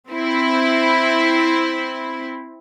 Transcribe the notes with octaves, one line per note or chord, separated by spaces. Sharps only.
C4 E4